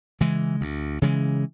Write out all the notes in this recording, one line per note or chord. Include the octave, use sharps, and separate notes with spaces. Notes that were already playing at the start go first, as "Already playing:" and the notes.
C#3 E3 G#3
D2
C#3 E3 G#3